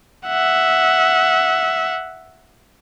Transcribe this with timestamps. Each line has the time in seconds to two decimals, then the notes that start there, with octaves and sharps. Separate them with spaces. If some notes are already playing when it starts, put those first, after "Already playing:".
0.26 E5 F#5